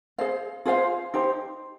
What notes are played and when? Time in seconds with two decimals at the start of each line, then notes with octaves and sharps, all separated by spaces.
0.18 G#4 C5 F5
0.65 F4 G#4 C5 F5
1.14 D#4 G4 C5